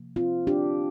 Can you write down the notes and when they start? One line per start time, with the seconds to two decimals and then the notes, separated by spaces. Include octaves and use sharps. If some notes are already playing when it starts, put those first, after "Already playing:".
Already playing: C3 F3 A#3
0.16 C4 F4
0.47 D4 G4